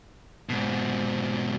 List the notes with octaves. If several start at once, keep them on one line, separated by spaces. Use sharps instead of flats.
G#2 B2